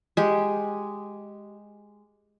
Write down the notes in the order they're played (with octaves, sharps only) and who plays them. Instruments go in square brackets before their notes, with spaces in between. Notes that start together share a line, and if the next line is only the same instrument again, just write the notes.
[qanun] G#3 G4